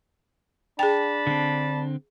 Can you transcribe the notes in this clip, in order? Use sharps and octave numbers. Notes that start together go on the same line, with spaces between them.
D4 G#4 G5 A5 B5
D3 C4